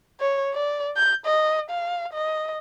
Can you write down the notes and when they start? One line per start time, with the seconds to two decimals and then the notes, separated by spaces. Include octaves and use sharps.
0.20 C#5
0.54 D5
0.97 G6
1.26 D#5
1.70 F5
2.13 D#5